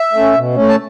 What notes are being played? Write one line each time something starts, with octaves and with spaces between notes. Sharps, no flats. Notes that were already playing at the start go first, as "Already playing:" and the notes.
Already playing: E5
A3 C#4
B2
A3 C#4
A5